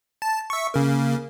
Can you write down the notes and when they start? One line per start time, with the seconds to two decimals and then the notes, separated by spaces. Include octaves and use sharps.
0.22 A5
0.50 E5 C#6
0.74 C#3 A#3